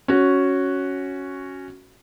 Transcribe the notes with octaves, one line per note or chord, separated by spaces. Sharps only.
C#4 F#4